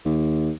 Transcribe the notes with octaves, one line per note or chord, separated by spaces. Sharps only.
D#2